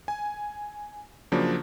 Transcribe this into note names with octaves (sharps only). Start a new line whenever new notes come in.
G#5
C#3 F3 F#3 A#3 D4